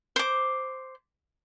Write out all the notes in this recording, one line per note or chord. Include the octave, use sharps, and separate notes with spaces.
C5 D6